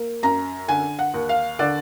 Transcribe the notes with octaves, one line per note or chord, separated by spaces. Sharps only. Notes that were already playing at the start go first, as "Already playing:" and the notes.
Already playing: A#3
F#2 A#5
D3 G#5
F#5
D#2
F5
D3 D5